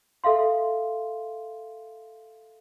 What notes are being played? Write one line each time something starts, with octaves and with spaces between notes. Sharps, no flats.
A4 E5 F5 C6